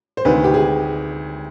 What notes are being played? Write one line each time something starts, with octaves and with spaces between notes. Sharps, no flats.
C5
D2 C3 D#3 B4
G4
G#4